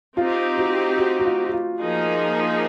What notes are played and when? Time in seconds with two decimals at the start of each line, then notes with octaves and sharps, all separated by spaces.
0.16 C4 D#4 F4 G4
0.57 F#4
0.98 F#4
1.20 F#4
1.25 F4
1.47 F#4
1.52 F4
1.79 F3 A#3 D#4 G#4